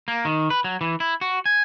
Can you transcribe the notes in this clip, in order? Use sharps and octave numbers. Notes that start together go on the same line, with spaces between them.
A#3
D#3
B4
F#3
E3
E4
F#4
G#5